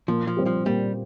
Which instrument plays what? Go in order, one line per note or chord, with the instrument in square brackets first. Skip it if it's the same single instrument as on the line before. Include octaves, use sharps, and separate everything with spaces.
[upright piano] A#2 [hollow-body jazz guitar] F3
[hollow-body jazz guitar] F3
[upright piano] G3 C4 G4
[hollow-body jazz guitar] F3
[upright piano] A#2 [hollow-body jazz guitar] G3